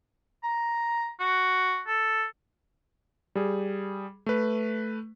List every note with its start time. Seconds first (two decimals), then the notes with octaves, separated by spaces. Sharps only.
0.44 A#5
1.20 F#4
1.87 A4
3.35 G3 G#4
4.26 A3 B4